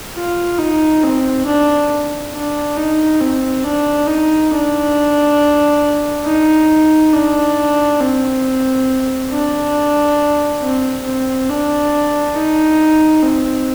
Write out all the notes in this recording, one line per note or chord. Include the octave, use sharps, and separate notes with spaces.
F4
D#4
C4
D4
D4
D#4
C4
D4
D#4
D4
D#4
D4
C4
D4
C4
C4
D4
D#4
C4